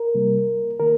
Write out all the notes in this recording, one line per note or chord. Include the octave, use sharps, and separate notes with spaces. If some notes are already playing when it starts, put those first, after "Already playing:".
Already playing: A#4
C3 G3 A#3
D#3 A#3 A#4